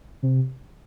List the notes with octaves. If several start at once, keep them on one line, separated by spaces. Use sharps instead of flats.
C3